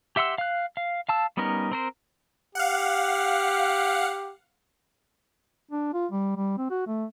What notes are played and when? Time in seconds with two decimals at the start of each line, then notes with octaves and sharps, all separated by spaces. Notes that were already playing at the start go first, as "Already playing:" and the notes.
0.16 G4 E5 F#5 C6 E6
0.38 F5 F#6
0.77 F5
1.09 F5 A5 E6
1.37 G3 B3 C#4 D#4 A#4
1.72 C4 A#4 C5
2.55 G4 F5 F#5
5.71 D4
5.94 F4
6.11 G3
6.37 G3
6.58 C4
6.71 F#4
6.87 A3